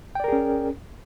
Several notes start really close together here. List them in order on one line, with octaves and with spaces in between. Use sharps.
G5 D5 A#4 G#4 C#4